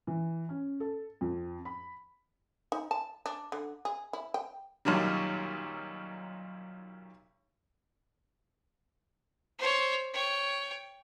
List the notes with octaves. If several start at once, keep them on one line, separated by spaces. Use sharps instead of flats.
E3
C#4
A4
F2
B5
D#4
A5
D4
D3
G#4
E4
G5
B1 F#2 A#2 D#3 F#3 G3
C5 C#5
C#5 G5